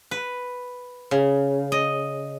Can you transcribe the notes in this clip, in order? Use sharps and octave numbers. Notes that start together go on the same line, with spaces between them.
B4
C#3
D#5